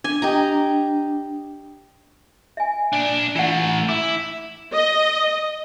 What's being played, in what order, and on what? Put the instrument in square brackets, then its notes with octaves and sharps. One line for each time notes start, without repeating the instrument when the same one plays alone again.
[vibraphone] D4 [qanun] G#5
[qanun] G4 D#5 A#5
[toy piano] E5 G#5
[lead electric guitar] A#2 D4
[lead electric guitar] E3 A3 [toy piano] F4 F#5
[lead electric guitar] E4 [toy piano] D6
[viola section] D#5